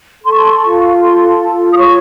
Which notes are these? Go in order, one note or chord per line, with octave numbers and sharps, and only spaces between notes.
A4 C6
C#6
C6
F4 C#6
A4 C6
F4
D#6
C#5 C#6